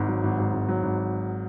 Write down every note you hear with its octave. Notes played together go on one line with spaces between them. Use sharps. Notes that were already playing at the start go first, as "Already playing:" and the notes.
Already playing: G#1 G#2
F#3
G#1
G#2
G#1
F#3
G#1